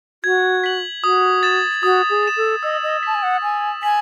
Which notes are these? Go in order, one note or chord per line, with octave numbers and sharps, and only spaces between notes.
F#4 G#6
B6 F#7
F#4 D#6
A6 E7
F#4 D#6
G#4
A6 E7
A4
D#5 E6
D#5
A5 B6 F#7
G#5
F#5
G#5 E6
G#5 B6 F#7